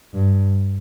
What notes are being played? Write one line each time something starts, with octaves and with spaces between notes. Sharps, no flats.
G2